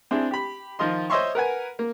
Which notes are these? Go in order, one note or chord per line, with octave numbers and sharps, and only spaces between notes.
C4 D4 E4 G#4
G4 B5
D#3 F3 F4 D#5 C6
C5 C#5 D#5 E5 C6 C#6
A#4 B4 F#5 G#5
A#3